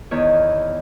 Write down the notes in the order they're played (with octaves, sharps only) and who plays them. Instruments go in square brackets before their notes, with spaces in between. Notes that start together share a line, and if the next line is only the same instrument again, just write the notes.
[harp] E2 D#3 B3 C#5